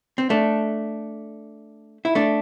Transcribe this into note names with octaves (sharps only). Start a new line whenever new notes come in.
C4
A3 D4
E4
A3 D4